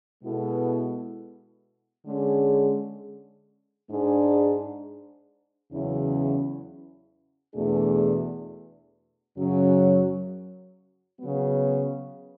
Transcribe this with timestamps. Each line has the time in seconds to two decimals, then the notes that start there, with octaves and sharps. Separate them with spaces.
0.23 B2 G#3 B3 E4 A4
2.06 D3 G#3 C#4 G#4
3.88 G#2 G#3 D4 G#4
5.70 E2 C#3 F#3 C#4 E4
7.53 E2 B2 A3 D4 G#4
9.36 F#2 C#3 F#3 C#4
11.19 C#3 F#3 B3